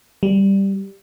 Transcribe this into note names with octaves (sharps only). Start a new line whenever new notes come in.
G3